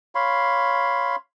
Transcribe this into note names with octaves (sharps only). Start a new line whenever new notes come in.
C#5 F5 B5 C6